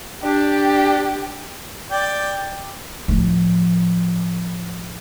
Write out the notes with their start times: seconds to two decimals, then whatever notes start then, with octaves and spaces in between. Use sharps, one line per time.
0.23 D4 G4
1.91 D5 G5
3.08 A2 F3